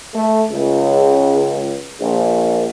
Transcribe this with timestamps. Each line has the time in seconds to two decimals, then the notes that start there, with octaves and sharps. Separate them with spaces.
0.14 A3
0.52 C#2
2.01 A#1